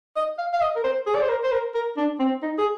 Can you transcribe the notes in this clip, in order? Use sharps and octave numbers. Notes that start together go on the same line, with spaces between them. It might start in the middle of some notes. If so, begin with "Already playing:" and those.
D#5
F5
F5
D#5
A#4
C5
G#4
D5
C5
A#4
C5
A#4
A#4
D4
C4
D#4
G#4